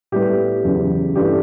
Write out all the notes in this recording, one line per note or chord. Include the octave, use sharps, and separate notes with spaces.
A2 G3 B3 G4
E2 C#3 F#3
G2 E3 A3 G4